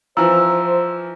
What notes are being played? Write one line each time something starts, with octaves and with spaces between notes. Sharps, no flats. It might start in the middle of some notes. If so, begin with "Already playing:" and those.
E3 F3 C5 A#5 E6